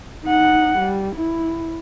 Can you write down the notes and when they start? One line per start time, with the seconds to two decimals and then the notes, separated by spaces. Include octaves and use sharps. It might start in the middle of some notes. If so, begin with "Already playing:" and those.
0.25 D#4 F#5
0.78 G3
1.15 E4